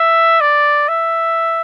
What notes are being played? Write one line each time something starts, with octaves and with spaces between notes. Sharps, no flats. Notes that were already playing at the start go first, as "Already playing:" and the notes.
Already playing: E5
D5
E5